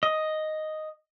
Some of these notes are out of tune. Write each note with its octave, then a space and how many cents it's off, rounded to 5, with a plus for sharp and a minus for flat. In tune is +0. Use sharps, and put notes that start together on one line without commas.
D#5 +0